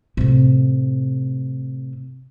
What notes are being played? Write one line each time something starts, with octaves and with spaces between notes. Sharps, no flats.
A2 C3